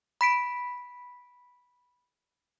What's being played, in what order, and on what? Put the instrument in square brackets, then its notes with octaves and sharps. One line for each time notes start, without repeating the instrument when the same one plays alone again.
[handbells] B5 B6 D7